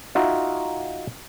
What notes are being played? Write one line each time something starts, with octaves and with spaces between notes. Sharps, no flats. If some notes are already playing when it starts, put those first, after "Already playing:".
D#4 F4 F#4 E5